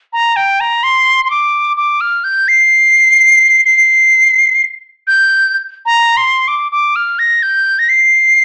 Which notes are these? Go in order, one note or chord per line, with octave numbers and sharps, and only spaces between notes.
A#5
G5
A#5
C6
C6
D6
D6
F6
G6
C7
C7
G6
A#5
C6
D6
D6
F6
A#6
G6
A#6
C7